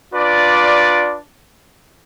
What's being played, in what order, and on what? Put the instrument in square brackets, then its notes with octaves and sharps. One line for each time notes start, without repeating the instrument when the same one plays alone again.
[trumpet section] D4 F4 B4 D5